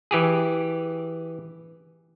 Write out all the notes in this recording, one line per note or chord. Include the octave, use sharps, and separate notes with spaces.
E3 G4 G#4